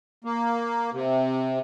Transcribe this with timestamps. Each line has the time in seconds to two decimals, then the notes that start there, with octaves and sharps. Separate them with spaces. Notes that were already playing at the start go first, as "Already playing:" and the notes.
0.24 A#3
0.93 C3